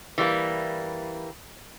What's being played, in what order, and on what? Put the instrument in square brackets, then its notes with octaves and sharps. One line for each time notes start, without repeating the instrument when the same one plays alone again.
[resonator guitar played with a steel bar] E3 G3 A#3